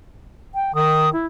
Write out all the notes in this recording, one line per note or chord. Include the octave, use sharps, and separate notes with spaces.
G5
D#3 D#6
E4